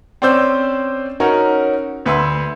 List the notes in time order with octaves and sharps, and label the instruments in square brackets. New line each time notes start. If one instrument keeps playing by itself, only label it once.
[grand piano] C4 C#4 C5 D5 E6 G6
C#4 D#4 F#4 A#4 C#5
D2 B4 E5 C6 E6